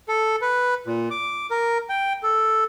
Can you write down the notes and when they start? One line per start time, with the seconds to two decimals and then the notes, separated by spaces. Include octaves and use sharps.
0.08 A4
0.42 B4
0.87 A#2
1.11 D6
1.51 A#4
1.89 G5
2.23 A4